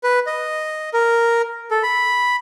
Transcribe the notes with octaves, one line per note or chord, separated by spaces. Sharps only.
B4
D#5
A#4
A4
B5